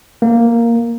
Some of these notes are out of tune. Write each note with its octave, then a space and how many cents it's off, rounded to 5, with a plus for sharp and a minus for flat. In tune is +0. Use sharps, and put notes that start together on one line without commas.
A#3 +0